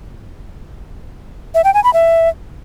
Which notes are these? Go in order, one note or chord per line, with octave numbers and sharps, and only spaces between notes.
E5
G5
G#5
B5
E5